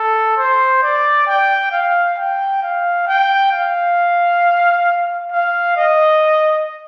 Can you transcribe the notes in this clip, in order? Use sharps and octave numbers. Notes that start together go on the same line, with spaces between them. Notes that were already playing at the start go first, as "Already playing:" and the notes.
Already playing: A4
C5
D5
G5
F5
G5
F5
G5
F5
F5
D#5